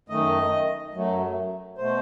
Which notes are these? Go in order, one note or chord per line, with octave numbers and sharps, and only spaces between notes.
F#2 D#3 A3 D#5
F#2 F#3 A3
B2 A3 C5